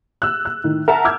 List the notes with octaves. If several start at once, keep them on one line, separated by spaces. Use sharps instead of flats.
E6 F#6
F#6
A2 D#3
A#4 E5 F#5 A5
D6 E6 F6 G6 G#6